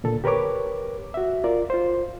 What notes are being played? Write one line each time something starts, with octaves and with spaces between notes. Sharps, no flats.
A#2 D3 A4
G4 A#4 B4 C#5 D6
F#4 E5
F4 A#4 D5
F4 C5